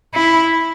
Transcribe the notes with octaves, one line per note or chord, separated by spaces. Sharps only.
E4